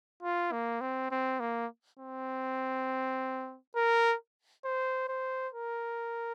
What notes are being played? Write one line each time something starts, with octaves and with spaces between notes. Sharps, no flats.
F4
A#3
C4
C4
A#3
C4
A#4
C5
C5
A#4